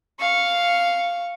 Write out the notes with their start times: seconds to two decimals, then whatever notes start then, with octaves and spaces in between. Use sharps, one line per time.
0.20 F5 C#6